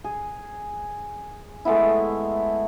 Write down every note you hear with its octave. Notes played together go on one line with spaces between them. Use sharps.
G#4
G#3 A3 B3 E4